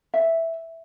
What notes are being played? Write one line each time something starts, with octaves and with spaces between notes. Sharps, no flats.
E5